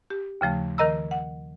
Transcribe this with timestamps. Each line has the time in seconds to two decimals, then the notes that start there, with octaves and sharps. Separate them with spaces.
0.10 G4
0.41 D#2 C#3 F3 A3
0.78 D#3 A#4 D#5 A#5 E6
1.11 F#5